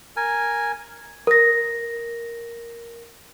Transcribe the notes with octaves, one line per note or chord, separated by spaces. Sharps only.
A#4 G#5
A#4 A#6